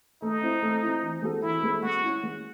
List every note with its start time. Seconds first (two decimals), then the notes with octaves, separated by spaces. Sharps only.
0.22 A3 D#4
0.42 C4 E4
0.63 A3
0.83 C4 E4
1.02 E3
1.22 G#3 C4 F#4 A4
1.43 E3 E4
1.63 G#3 C4 F#4 A4
1.83 G#3 F#4
2.03 C#4 E4
2.23 G#3